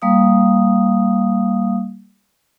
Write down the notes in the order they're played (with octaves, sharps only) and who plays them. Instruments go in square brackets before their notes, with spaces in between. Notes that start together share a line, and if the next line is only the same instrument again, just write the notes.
[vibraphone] G3 A#3 F5 D#6